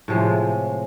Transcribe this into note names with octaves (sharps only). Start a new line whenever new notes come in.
A2 C3 F3 G#3